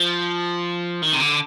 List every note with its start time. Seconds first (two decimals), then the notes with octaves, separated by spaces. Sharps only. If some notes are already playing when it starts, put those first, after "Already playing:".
Already playing: F3
1.02 D#3
1.14 C3
1.20 D3